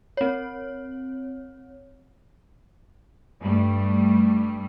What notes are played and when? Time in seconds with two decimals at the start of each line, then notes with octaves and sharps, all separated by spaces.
0.17 C4 C#5
3.42 G2 G3 A3